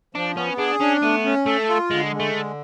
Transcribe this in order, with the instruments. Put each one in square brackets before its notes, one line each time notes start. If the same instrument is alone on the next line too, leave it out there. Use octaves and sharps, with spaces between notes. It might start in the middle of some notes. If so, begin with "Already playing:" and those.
[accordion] F3 [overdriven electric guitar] D4
[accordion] B3 [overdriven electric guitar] C#4
[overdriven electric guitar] D4 [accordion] G#4
[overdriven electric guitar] C#4 [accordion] D4
[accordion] A3 [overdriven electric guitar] B3
[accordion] C#4
[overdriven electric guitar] A3 [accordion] A4
[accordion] F4
[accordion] D3 [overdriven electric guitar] G#3
[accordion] G#3
[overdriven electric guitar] A3
[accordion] D3